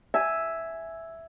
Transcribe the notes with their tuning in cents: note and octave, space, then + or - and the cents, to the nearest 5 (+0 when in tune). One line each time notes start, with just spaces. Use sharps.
E5 +0 G#5 +0